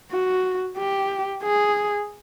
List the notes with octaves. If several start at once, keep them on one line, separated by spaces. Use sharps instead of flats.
F#4
G4
G#4